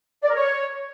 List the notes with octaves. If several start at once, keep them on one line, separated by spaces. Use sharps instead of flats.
D5
A#4
C#5